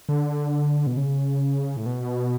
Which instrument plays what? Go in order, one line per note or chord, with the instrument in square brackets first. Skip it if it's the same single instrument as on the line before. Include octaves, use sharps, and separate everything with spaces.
[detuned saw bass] D3
B2
C#3
A2
B2